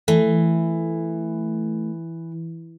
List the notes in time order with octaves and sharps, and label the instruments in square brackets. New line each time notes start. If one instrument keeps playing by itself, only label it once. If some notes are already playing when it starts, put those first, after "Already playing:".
[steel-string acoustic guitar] E3 [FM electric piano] A3